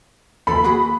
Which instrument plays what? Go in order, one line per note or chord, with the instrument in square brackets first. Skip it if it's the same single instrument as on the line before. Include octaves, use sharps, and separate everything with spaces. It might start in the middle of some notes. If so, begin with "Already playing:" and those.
[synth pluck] D#2 F3 A4 [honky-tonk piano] B5
[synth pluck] A#3 F#4 G#4